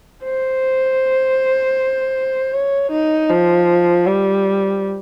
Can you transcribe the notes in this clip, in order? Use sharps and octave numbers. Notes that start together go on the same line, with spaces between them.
C5
C#5
D#4
F3
G3